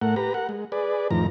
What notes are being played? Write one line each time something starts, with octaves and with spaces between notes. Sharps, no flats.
A2 A3 A#4 F#5
G4 B4 A#5
A#4 F#5
G#3
G#4 B4 D5
F2 A2 D#3 F3 A#5